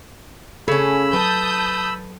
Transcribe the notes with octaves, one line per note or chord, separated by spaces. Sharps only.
C#3 C#4 A4 B5 E6
F#3 B4 A5 D#6 G6